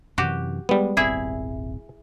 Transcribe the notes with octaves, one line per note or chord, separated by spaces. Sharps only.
F#2 C3 E3 F#4 G4
G3 G#3 B3
D#1 G#1 C4 E4 G#4 E5